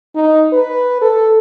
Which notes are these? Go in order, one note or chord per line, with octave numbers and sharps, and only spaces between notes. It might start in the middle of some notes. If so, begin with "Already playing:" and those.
D#4
B4
A4